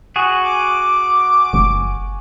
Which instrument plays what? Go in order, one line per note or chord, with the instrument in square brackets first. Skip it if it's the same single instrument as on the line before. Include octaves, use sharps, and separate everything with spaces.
[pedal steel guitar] F#4 G#4
[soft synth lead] D6
[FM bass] F#1